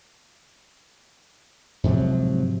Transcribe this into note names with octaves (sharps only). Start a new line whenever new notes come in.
G#2 C3 F3 F#3